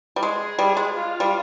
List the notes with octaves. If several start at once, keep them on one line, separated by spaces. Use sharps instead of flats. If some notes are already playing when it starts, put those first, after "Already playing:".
G3
G#3 G#4
G3
G#3
F4
G3